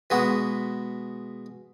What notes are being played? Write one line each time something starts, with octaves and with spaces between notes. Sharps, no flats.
B2 G#3 B3 F#4